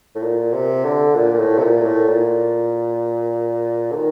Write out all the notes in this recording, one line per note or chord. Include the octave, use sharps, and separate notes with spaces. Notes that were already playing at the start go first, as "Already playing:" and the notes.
A2
A#2
C3
D3
A#2
A#2
A2
C3
A#2
A2
A#2
D3
D#3